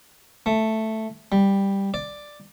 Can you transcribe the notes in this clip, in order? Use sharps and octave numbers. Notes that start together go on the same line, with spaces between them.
A3
G3
D5